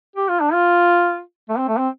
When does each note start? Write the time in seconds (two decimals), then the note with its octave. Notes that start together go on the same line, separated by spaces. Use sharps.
0.16 G4
0.29 F4
0.40 D4
0.53 F4
1.49 A3
1.58 C4
1.68 A3
1.78 C4